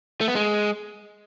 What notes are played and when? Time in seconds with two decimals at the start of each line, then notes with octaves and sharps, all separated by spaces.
0.21 A3
0.28 B3
0.35 G#3